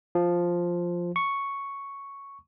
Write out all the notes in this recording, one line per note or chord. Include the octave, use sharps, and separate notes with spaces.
F3
C#6